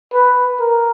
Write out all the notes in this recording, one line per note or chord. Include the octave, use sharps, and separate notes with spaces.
B4
A#4